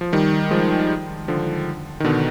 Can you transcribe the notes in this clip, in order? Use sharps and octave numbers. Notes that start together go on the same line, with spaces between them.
F3
D#3 G3
F3 G#3
D3 F3
D#3
B2 D3